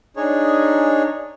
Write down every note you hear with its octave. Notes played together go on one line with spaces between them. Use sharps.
D4 D#4 G#4 C#5